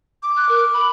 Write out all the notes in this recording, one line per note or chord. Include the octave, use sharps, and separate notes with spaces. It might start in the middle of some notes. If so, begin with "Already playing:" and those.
D6
F#6
A#4
B5